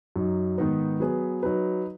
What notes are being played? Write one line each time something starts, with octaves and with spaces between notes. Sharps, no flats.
F#2 F#3 D#4
G#2 D#3 B3 D#4 B4
F#3 B3 G#4 B4
F#3 D#4 B4